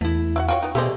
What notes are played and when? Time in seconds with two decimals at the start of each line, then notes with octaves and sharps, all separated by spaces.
0.01 E2 A3 E4
0.36 E4 F#4 F#5
0.49 F4 F#4 C#5 G5
0.63 B3 D#4
0.75 B2 A3 G4 G#4 C5 D5 D#5